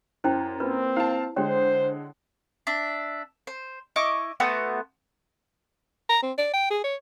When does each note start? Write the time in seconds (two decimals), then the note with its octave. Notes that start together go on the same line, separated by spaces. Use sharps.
0.24 F#2 E4 C5 G5
0.60 A#3 C4 F4 B4
0.96 E4 F5 A5
1.36 D3 G#3 C5 C#5 F#5 G5
2.67 D4 E5
3.47 C5
3.96 E4 D#5 C#6 D6
4.40 A3 B3 F#4 C5
6.09 A#5
6.23 C4
6.38 D5
6.53 G5
6.70 G#4
6.84 C#5